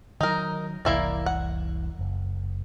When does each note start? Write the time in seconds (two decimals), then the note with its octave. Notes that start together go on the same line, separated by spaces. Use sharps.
0.21 D#3 E3 F#3 D#4 A#4
0.85 F1 C2 E3 A#3 E4 D5
1.26 F#5
1.99 F#1